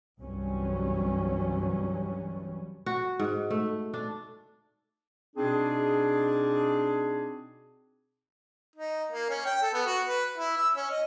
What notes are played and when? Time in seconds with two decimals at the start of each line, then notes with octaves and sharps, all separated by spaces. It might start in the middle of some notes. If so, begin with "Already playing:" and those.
0.19 C2 G2 E3 F#3 G3 C#4
2.86 F#4
3.20 G#2
3.50 A3
3.94 D4
5.36 B2 C4 D4 D#4 G#4
8.76 D#4
9.12 A#3
9.29 C#4
9.46 G5
9.62 A4
9.74 B3
9.87 F#4
10.06 B4
10.38 E4
10.58 E6
10.76 C#4
10.90 D#5